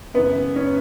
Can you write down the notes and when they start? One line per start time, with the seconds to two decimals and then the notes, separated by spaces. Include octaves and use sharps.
0.14 F#2 C#3 E3 B3
0.56 C#4